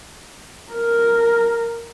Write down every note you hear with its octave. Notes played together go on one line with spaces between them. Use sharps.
A#4